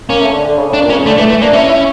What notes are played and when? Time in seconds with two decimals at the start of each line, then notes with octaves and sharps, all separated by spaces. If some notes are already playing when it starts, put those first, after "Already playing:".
0.09 A#3 C#4
0.21 A3
0.33 D3
0.45 D3
0.57 C#3
0.70 A2
0.73 D4
0.82 A#2
0.90 C#4
0.93 C#3
1.05 D3 A3
1.18 E3 A3
1.29 E3 A3
1.41 A#3 D4
1.53 C#4 E4
1.70 E4